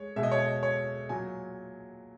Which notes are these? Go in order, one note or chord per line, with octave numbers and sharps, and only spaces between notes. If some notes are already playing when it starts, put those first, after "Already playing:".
Already playing: G#3 C#5
B2 G#3 E5
D#5
C#5
D#5
C#5
A#2 F#3 G#5